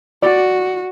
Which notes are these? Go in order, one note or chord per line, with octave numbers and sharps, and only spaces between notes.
F#4 D5